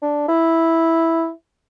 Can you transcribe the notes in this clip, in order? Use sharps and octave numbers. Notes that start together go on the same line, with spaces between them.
D4
E4